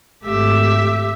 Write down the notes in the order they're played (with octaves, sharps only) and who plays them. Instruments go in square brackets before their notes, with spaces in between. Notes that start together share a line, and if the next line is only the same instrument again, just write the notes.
[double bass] G#1 A3 [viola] G4 E5